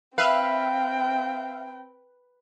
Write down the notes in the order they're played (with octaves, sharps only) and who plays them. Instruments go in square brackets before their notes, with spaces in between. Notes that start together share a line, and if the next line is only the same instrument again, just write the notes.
[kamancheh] C4 G5 [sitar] B4 [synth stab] E5 F5